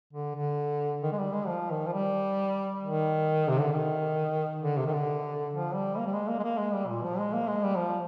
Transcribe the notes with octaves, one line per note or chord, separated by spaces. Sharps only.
D3
D3
D#3
G#3
G3
G#3
F3
D#3
F3
G3
D#3
C3
D3
D#3
D3
C3
D#3
D3
F3
G3
A#3
G3
G#3
A#3
G#3
A#3
G#3
G3
A#2
F3
G#3
A#3
G#3
G3
F3